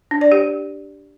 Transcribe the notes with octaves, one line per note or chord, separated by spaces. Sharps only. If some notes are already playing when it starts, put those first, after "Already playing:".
D4
D5
G4